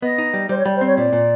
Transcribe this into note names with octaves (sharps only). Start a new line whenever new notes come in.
B3 D#5
D#4
G3
G3 C5
C#5
G3 D5
C5
C4
C#5
A#2 D5
A#2